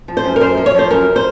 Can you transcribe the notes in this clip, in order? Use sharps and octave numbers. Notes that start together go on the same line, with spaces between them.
F3
C5
F#2
A#4
F#2 C5
F3
C#5
F3 C5
F#2 A#4
C5